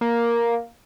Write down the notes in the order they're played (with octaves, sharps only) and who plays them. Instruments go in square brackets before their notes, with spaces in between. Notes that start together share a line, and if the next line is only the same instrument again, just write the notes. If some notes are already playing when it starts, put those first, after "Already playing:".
[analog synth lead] A#3